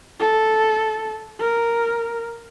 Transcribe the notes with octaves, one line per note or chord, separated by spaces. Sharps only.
A4
A#4